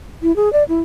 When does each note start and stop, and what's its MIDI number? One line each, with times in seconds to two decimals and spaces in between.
0.22 0.34 64
0.36 0.52 68
0.53 0.63 74
0.69 0.80 64